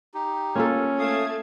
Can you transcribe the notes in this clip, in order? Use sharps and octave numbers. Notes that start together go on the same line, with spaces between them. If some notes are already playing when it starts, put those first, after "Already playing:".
D#4 G4
A#3 C#4 F4 A4
A3 F5 A5 D#6 G#6